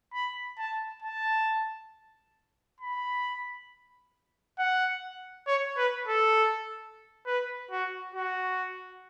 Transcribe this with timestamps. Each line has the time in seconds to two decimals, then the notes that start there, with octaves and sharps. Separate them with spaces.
0.14 B5
0.58 A5
1.02 A5
2.80 B5
4.58 F#5
5.47 C#5
5.77 B4
6.08 A4
7.26 B4
7.71 F#4
8.15 F#4